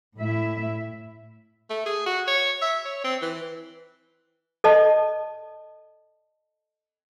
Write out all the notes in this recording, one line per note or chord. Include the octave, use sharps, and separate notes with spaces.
A2 E4 E5
A3
G#4
F#4
C#5
E5
C#5
C4
E3
A4 D5 D#5 A5